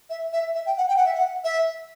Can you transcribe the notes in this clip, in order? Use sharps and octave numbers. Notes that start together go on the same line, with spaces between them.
E5
E5
E5
G5
F#5
G5
F#5
E5
F#5
E5